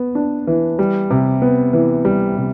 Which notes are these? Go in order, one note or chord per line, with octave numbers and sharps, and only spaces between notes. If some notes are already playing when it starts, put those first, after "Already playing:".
Already playing: B3
D4
E3
G3
C3
B3
E3
G3
C3